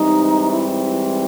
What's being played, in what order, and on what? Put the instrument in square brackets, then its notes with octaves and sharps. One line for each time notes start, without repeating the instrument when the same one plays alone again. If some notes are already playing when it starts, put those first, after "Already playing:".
Already playing: [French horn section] G#2 E3 G3 C4 [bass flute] D#4
[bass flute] E4